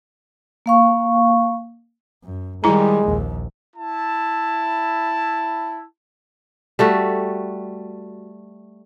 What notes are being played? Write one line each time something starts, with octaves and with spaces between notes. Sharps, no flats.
A#3 F5 C#6
F#2
D#3 G3 G#3 E4 A#5
A#1 D#2
E4 A5
G3 A3 F#4